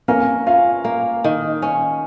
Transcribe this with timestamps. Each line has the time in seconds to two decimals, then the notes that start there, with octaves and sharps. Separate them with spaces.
0.08 A#3 C#4 A#4
0.46 C#4 F4 F5
0.85 A#3
1.24 D#3
1.62 C#4